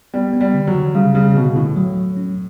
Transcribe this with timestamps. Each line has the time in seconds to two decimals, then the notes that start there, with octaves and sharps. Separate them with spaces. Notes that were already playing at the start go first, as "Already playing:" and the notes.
0.14 G3 B3
0.33 B3
0.41 G3
0.54 D3
0.67 F#3
0.75 D3
0.95 C#3 G3
1.15 C#3 G3
1.35 B2 D3
1.56 A2 D3
1.76 F#3
1.96 F#3
2.17 C#4